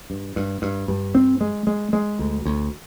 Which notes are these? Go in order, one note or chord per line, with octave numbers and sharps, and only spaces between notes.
G2
G2
G2
G2
C4
G#3
G#3
G#3
D2
D2